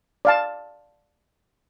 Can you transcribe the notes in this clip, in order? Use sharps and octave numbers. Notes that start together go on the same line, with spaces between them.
D5 F5 A5